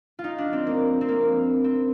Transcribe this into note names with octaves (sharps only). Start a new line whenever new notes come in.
F4
D#4
D4
C4
A#3
C4
A#3
C4